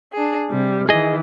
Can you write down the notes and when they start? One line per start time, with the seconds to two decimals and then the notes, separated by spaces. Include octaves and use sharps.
0.13 D4 G#4
0.50 C3 G3
0.89 D#3 E3 G#4 D#5